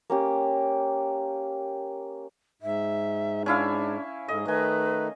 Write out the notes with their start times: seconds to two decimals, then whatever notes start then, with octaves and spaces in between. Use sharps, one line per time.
0.10 A#3 C#4 G4
2.62 G#2 E5
3.46 C#4 D4 E4 F5
4.28 G#2 A4 D#5
4.45 D#3 A3 D#4 B4 D#5 G#5